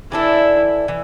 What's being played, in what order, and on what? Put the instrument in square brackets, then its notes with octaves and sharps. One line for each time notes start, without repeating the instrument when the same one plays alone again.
[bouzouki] E3 D4 A4 [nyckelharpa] E4
[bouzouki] E3